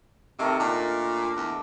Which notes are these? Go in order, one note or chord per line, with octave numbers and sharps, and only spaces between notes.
C3 D#3 A3 A#4
A#2 D4
E2